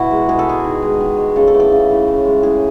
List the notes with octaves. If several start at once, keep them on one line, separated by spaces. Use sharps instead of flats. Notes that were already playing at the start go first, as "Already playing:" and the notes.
Already playing: B2 E4 F#4
G#3
B2 G#4
A4
G#3 G#4
D#3
G#3
D#3
G#3
C#3 A4
A4
E3 A3
A4
C#3
E3 A3
A2
G#3
A2 G#4